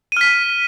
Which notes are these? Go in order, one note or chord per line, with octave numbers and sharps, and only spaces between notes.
F6 B6 D#7